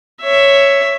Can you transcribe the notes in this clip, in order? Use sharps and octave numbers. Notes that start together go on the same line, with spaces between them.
C#5 E5